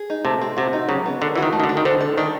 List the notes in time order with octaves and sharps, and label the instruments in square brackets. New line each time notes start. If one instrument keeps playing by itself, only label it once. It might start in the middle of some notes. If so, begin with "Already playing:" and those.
Already playing: [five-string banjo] G#4
D#4
[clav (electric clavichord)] C3 [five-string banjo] A3
[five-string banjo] C4
[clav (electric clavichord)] C3 [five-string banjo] F#4
[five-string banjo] D#4
[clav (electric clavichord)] C#3 [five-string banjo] F#3
[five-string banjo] B3
[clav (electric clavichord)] D3 [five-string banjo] A#4
[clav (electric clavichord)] E3 [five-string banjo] F#4
[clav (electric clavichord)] D#3
[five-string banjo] A3
[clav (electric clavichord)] D#3
D3
[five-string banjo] D4
[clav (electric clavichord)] D#3
[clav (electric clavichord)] D3 [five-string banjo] C5
[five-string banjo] A4
[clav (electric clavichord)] D#3 [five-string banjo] D4